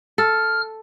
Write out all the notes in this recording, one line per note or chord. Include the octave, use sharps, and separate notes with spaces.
A4 F6